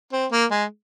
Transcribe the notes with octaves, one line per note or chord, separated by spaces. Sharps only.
C4
A#3
G#3